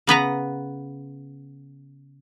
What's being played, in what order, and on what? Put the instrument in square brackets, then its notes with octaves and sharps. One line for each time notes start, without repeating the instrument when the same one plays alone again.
[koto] C#3 B3 B4 A#5